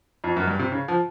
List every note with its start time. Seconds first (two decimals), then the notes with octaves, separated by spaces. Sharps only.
0.24 F2
0.36 F#2
0.47 G2
0.59 C3
0.72 C#3
0.88 F3